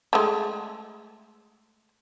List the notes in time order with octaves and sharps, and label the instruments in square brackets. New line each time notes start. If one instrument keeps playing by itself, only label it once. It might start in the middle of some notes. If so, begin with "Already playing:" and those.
[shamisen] G#3 A3